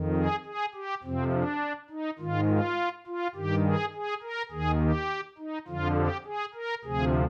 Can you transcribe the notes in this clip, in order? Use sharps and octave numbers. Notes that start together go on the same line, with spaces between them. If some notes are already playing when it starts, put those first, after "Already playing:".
Already playing: F2 D#3
G#4
G#4
G4
F2 C3 F3 C4
D4
D#4
G#2 D#3 F4
F4
F4
G2 D#3 G4
G#4
G#4
A#4
D#2 D#3 G#4
G4
D#4
F2 D3 F3 F4
G4
G#4
A#4
D2 C3 F3 G#4